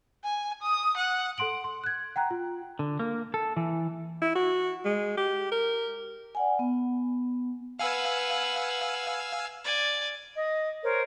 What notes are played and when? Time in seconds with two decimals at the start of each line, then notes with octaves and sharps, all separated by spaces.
0.24 G#5
0.62 D#6
0.97 F#5
1.38 A4 F#5 C6 D7 F#7
1.64 C6
1.84 F#6 G#6
2.16 F#5 G5 A#5 F#6
2.31 F4
2.79 D3
2.99 A#3
3.34 A4
3.57 E3
4.21 E4
4.35 F#4
4.85 G#3
5.17 G4
5.51 A#4
6.35 D5 F#5 G#5
6.59 B3
7.79 B4 F5 F#5 G#5 E6
9.64 D5 G#5
10.36 D#5
10.83 A#4 C5 C#5